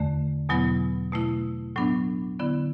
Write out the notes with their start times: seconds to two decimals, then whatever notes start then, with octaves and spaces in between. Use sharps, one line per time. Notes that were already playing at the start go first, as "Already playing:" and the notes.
Already playing: E2 D3 A3
0.49 E2 B2 F#3 B3 E4
1.13 B2 A3 E4
1.76 A2 F#3 B3 D4
2.39 D3 B3 E4